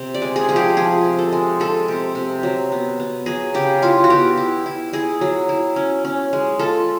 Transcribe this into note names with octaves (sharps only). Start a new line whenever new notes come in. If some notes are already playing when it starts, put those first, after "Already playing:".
Already playing: C3
D5
G#3
G#4
F3 G#4
G4
F3 G#4
C3
A4
G#3
G#3 A4
C3
C3
F#3
B3
B3
F#3 G#4
C#3 G4
E4 F4
F#4
B3 G4
E4
E4
E4 G#4
F#3
E4
C#4
C#4
G#3
F4 A4